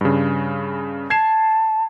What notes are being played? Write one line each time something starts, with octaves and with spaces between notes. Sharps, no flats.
G2 C#3
A5 G#6 C7 E7